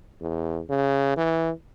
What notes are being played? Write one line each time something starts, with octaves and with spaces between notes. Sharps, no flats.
E2
C#3
E3